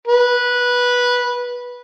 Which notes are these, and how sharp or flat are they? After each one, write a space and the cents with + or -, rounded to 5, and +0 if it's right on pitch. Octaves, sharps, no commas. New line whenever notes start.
B4 -10